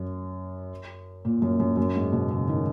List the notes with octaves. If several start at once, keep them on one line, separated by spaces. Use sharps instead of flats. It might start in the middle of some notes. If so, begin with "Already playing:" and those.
Already playing: F#2
A#2
F#2
F#2
F#2
G#2
B2
C#3
D#3